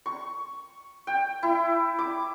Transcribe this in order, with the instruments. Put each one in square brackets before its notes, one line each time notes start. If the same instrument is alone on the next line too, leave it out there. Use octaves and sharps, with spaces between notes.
[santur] C#6
G5
E4
D6